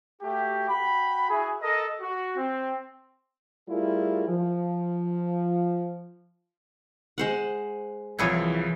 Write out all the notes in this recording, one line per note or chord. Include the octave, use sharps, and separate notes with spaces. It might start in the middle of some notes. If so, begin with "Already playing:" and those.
A3 F#4 G4
F#4 G5 B5
E4 F#4 G#4
A4 A#4 D#5
F#4
C4
G3 A3 E4 F4 G#4 A#4
F3
G#3 C5 F#5
C2 E3 F3 E4 G#4 C#5